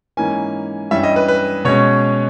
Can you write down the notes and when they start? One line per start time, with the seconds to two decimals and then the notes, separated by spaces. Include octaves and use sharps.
0.17 G#2 E3 A#3 C#4 G#5
0.91 G2 E3 G3 C#4 E5
1.04 D#5
1.16 B4
1.28 B4
1.65 B2 G#3 C#4 C#5